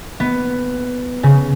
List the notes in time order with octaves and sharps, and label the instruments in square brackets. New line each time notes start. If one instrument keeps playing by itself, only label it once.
[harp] B3
C#3